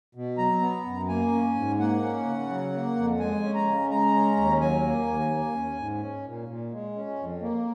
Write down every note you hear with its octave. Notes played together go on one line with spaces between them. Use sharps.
B2
F#3 A#5
B3
F#2
A#3 G#5
C#4
G#2
A#3 F#5
C#4
C#3
F#3
A#3
F2
G#3 G#5
C#4
A#5
C#3
G#3 A#5
C#4
D#2
F#3 G#5
A#3
D#2
A#3
C#4
G#2
C#4
A#2
A#2
G#3
C#4
F2
A#3